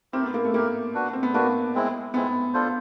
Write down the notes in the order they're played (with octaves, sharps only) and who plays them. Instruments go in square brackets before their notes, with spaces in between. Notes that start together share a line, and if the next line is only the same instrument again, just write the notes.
[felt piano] C4 [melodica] E4 G4 A#4
[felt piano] B3
A#3
A3
[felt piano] A#3 [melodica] E4 G4 A#4
[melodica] D4 F#4 B4
[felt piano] C4
B3
[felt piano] A#3 [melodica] D4 F#4 B4
[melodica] G#3 C4 E4
[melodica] G#3 C4 E4 [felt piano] B3
[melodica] D4 F4 A4 C5